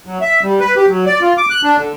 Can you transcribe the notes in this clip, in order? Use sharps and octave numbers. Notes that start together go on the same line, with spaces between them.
F#3
E5
G3
B4
G4
F#3
D5
F4
D6
F#6
D4
D3